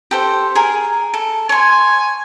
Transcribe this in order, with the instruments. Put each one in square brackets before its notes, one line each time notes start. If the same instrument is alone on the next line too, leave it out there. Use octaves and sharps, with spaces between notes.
[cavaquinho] G4 A4 C5
G#4 A#4
A4
[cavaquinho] C#5 C6 [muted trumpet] G#5